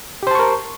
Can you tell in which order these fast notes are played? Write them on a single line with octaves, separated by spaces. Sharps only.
G4 C5 A5 C#6 A#4